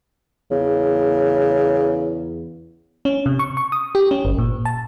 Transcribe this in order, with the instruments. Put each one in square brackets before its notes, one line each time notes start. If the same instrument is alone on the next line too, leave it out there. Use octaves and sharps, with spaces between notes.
[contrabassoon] E2 [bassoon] C#3
[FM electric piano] C#4
C3
C#6
C#6
D#6
G4
C#4
G1
A#2
A5